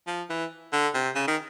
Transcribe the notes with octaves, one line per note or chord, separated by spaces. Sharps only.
F3
E3
D3
C3
C#3
D#3